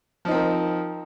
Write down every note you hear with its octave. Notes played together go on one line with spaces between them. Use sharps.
F3 C4 D#4 A#4